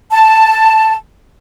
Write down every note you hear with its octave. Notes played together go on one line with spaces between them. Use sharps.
A5